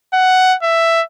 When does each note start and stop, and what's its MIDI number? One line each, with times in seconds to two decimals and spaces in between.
0.13 0.55 78
0.63 1.02 76